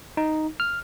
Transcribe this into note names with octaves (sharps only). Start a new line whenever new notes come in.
D#4
F6